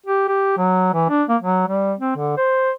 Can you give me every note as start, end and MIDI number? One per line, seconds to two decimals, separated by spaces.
0.06 0.24 67
0.28 0.53 67
0.57 0.90 54
0.94 1.06 52
1.10 1.23 62
1.29 1.37 58
1.41 1.64 54
1.68 1.94 55
1.99 2.16 60
2.16 2.34 50
2.37 2.71 72